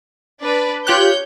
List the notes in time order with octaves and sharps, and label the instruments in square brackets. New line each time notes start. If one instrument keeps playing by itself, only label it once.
[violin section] D4 B4 D5
[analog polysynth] F4 G4 F#6 [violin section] C#5 G6